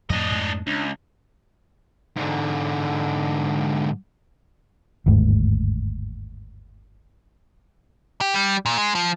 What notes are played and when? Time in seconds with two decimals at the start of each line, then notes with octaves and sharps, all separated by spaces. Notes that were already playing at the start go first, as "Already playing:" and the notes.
0.10 F2 A2 D4 D#5
0.30 F2 G#2 A3
0.67 C#2 D4
2.17 G#2 D3
5.06 G1 D#2 G#2 A3
8.21 G4
8.34 G3
8.66 A#2
8.78 G#3
8.95 F3